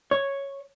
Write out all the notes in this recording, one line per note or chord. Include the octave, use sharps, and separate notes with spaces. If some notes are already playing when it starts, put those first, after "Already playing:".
C#5